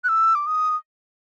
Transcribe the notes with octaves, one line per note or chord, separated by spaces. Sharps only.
F#6
E6
D6
D#6